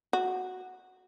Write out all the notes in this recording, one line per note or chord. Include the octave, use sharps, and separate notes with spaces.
F#4